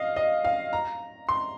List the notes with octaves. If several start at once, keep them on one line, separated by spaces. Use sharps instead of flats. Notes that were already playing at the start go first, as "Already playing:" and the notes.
Already playing: D#5 F5
D#5
F5
A#5
C6